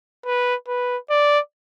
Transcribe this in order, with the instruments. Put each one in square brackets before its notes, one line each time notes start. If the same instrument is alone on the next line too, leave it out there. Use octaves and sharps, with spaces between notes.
[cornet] B4
B4
D5